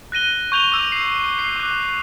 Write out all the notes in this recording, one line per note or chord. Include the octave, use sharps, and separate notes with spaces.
F#6 A#6 D#7 G7
C#6 G6 F7 G7
D6 E6 G6
C7
C7
D6 F#6